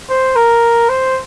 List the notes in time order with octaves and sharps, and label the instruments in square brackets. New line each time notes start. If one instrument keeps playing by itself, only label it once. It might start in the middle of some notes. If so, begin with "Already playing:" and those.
[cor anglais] C5
A#4
C5